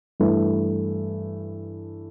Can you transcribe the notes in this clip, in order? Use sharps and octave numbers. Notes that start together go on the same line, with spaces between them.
G2 E3 A3